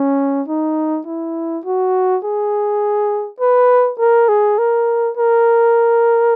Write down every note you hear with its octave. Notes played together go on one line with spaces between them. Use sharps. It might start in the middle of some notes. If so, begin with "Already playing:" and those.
Already playing: C#4
D#4
E4
F#4
G#4
B4
A#4
G#4
A#4
A#4